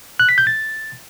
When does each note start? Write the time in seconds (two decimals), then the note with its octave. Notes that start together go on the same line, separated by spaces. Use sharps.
0.20 F#6
0.29 B6
0.38 G6
0.47 A6